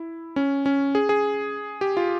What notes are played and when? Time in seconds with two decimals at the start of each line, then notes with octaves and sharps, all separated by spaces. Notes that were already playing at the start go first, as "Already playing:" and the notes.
Already playing: E4
0.36 C#4
0.66 C#4
0.95 G#4
1.09 G#4
1.81 G4
1.97 F4